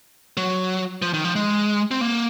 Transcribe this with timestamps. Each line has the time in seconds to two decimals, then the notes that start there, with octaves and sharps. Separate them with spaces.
0.37 F#3
1.02 F3
1.14 D#3
1.24 F3
1.36 G#3
1.91 C4
2.01 A#3